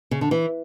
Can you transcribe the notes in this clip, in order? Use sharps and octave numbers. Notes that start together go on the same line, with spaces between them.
C#3
D3
E3